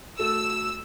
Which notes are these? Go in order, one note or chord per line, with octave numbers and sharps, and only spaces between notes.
A3 F#4 A4 E6